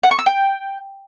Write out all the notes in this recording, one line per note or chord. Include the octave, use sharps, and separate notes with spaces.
F#5
C#6
E6
G5